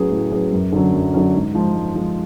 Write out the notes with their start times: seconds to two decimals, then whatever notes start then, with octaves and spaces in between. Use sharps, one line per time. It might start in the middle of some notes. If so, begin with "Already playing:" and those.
Already playing: A2 F#3 C#4 G#4 B4
0.11 A2
0.31 F#3 C#4 G#4 B4
0.52 F#2
0.72 D3 F#3 C#4
0.93 F#2
1.14 D3 F#3 C#4
1.34 G#2
1.54 F3 G#3
1.74 G#2
1.95 F3 G#3